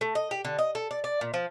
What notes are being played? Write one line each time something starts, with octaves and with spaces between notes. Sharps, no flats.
A3
D#5
G4
D3
D#5
A4
D5
D5
A#2
F3